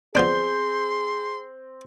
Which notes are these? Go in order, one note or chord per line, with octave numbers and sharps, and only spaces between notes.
F3 B3 C4 D4 G#4 C6 G6